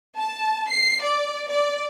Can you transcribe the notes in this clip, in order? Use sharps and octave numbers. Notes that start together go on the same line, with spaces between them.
A5
C7
D5
D5